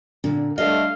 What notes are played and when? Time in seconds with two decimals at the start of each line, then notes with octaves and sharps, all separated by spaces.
0.24 A#2 D3
0.58 G3 A3 D4 A4 D#5 F5